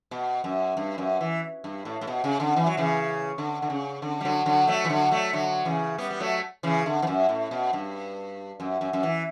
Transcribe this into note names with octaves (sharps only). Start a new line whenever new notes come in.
B2
F#2
G2
F#2
E3
G2
A2
A2
B2
C#3
D3
E3
F#3
C#3 E3
D3
D3
C#3
D3
G3
D3 F#3
D3 F#3
F#3 A3
E3
D3 F#3
F#3 A3
D3 F#3
C#3 E3
G3 B3
B3
F#3 A3
C#3 E3
D3
E3
F#2
A2
B2
G2
F#2
F#2
F#2
E3